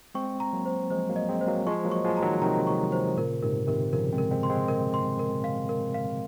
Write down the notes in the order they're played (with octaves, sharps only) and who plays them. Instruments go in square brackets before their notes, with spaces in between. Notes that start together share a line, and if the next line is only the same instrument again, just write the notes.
[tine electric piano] G#3 C4 [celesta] C#6
[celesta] A#5
[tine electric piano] F#3 A#3
[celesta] C5
[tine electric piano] F3 G#3 [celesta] C5
[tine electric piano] F#3 A#3
[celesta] D#5
[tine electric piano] G#3 C4
[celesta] C5
[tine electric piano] F#3 A#3
[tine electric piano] F3 G#3 [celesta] C#6
[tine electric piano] F#3 A#3
[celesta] C#6
[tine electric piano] F3 G#3
[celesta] A#5
[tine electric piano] D#3 F#3
[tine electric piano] C3 D#3 [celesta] A#5
[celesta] C#6
C5
[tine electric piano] A#2 C#3 [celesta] A#4
[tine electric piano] G#2 C3 [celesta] A#4
[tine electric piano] C3 D#3 [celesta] A#4
[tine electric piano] C#3 F3 [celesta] A#4
[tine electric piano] G#3 C4
[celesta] A#4
[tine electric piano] G#3 C4
[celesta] C6
[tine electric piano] G#3 C4
[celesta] A#4
C6
A#4
F5
A#4
F5